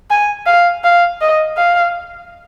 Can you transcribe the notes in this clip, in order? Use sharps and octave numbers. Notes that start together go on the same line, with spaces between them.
G#5
F5
F5
D#5
F5